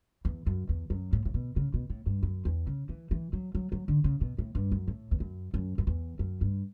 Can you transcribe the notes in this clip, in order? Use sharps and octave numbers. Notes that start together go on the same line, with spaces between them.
E2
F#2
E2
F#2
A2
A2
B2
C#3
B2
A2
G2
F#2
E2
C#3
E3
E3
F#3
F#3
F#3
D3
C#3
B2
A2
G2
F#2
A2
E2
F#2
F#2
F#2
E2
F#2
G2